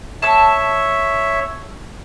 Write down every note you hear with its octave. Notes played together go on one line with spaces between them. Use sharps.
C#5 E5 A5 E6